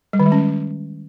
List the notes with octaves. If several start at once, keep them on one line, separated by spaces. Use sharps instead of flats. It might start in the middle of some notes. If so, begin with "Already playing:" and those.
G3
D#3
G#3
C#4